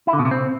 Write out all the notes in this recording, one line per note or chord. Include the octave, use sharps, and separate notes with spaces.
E4
D3
B2
C3
C4